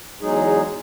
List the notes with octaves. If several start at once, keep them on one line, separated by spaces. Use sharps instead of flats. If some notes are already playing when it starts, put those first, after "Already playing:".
E2 F#3 G#3 D#4 G#4